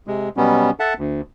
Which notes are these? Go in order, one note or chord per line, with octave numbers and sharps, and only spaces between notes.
C3 G#3
B2 F#3 G3 B3 C#4
A4 E5 F#5 A5
D2